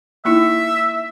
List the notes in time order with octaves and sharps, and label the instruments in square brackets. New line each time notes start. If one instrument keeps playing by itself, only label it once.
[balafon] A#3 D#4 E4 [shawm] E5